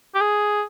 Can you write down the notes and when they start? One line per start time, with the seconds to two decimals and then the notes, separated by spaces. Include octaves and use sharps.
0.15 G4
0.21 G#4